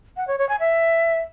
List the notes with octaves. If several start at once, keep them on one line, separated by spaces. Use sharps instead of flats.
F#5
C#5
C#5
G#5
E5